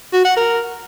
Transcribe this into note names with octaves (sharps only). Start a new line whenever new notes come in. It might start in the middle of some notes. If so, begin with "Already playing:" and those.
F#4
F#5
A#4